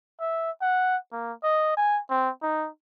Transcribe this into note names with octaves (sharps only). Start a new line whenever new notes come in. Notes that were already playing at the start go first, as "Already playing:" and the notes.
E5
F#5
A#3
D#5
G#5
C4
D#4